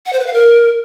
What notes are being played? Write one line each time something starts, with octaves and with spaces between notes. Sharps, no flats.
F#5
C5
B4
F5
A#4